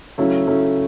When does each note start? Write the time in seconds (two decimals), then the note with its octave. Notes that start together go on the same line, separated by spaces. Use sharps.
0.18 C#3 F#3 A3 C#4 E4
0.47 C#3 F#3 A3 C#4 E4